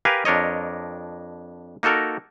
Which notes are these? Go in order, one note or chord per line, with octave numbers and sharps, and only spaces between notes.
G4 A#4 B4 F5 G#5
F2 D4 A#4 C#5 D#5
A#3 D#4 F#4 A4 A#4